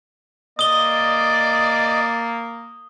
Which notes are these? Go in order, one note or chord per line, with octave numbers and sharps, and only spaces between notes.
A#3 D5 D#5 D#6 G7